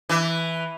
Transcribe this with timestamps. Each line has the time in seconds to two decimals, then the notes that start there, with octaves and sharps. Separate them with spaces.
0.09 E3